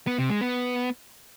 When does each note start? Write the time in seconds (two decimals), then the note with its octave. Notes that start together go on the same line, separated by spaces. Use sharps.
0.07 B3
0.18 C3
0.30 G#3
0.41 B3